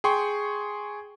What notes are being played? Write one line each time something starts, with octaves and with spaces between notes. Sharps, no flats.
G#4 G5 C6 C#6